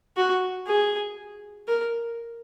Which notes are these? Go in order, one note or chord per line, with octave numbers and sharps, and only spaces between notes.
F#4
G#4
A#4